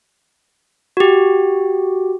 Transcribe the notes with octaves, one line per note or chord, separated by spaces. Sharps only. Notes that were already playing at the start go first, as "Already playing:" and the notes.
F#4 G4